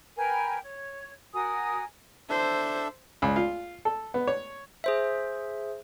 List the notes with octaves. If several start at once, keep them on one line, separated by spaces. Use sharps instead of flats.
A#4 B4 G5 G#5
C#5
F#4 A#4 G#5 D#6
D4 A4 C5 E5
C#2
F4
A4
B3
C#5
G#4 C5 E5